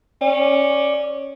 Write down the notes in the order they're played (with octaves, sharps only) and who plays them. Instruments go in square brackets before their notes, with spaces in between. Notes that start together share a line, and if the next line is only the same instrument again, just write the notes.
[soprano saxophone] C#4 [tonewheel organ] D5